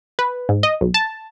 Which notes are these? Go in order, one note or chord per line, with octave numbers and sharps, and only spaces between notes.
B4
G#2
D#5
B1
A5